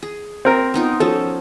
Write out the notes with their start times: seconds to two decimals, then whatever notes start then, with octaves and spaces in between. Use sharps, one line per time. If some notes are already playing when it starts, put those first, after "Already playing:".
0.03 G#4
0.45 C4 A#4
0.74 B3 D#4 F4
1.00 F3 C#4 A4